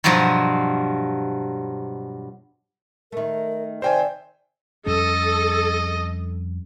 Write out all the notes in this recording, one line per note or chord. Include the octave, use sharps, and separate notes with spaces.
G2 B2 F3 F#3
D#3 A3 A#4
C3 D#3 C5 D5 G5 G#5
F2 G3 C#4 A4 D#5